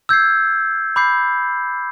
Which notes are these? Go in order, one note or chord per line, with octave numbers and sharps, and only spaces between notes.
E6 G6 G#6 C7
B5 D6 G6 C7